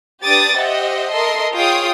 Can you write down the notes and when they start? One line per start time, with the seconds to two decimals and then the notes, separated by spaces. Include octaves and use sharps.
0.25 D4 G4 B4 D6 D#6 A6
0.56 G4 C5 D#5 E5 F#5
1.13 A4 A#4 D#5 E5 C6
1.53 F4 G#4 C#5 F5 G5 D#6